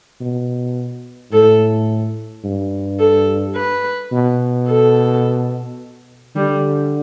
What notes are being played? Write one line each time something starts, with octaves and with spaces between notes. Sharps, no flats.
B2
A2 A4
G2
A4
B4
B2
A4
D3 G3